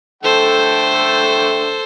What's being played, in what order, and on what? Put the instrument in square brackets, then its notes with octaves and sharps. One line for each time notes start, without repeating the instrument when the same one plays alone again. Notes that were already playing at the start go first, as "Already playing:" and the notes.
[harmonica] D3 A3 G5 [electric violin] A4 C5